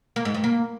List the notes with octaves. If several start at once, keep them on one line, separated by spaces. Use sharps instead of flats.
A#3
G#2
G2
A#3